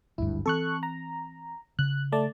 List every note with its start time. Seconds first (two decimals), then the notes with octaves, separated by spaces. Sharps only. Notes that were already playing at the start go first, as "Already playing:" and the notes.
0.18 G#1 D2 G2 E4
0.46 E3 C4 A4 C#6 F#6
0.83 A#5
1.79 C#3 F#6
2.12 A3 D5 A5